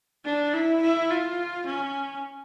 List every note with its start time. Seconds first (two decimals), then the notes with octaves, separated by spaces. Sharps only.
0.25 D4
0.53 E4
0.82 E4
1.10 F4
1.66 C#4